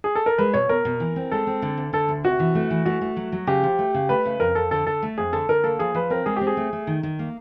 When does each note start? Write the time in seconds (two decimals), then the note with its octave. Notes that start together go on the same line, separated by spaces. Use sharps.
0.04 G#4
0.15 A4
0.26 A#4
0.38 G#3 B4
0.53 B2 C#5
0.69 B2 A#4
0.85 B2
1.00 E3
1.16 C4
1.31 G#3 A4
1.47 C4
1.62 D3
1.77 D2
1.93 D3 A4
2.09 D2
2.24 C3 F#4
2.40 E3
2.55 A3
2.70 E3
2.85 A3 F#4
3.01 A3
3.17 F#3
3.32 F#3
3.47 C#3 G4
3.64 F3
3.79 A3
3.94 C#3
4.09 A3 B4
4.26 C#3
4.40 F2 A#4
4.55 F2 A4
4.71 D3 A4
4.87 D3 A4
5.02 A3
5.18 F2 G#4
5.33 D3 A4
5.49 D3 A#4
5.64 A#3 A4
5.79 F3 G#4
5.94 F3 B4
6.10 C4 A#4
6.26 G#3 G#4
6.36 C4 G4
6.47 G#4
6.57 A3
6.73 A3
6.87 D#3
7.03 D#3
7.19 A#3